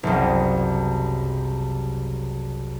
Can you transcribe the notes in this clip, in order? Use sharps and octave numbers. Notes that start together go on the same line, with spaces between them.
F#1 C2